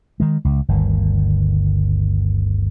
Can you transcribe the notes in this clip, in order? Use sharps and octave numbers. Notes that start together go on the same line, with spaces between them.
D#3 G#3
C#2
G1 D2 D#3